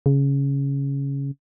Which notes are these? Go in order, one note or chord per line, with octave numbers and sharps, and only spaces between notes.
C#3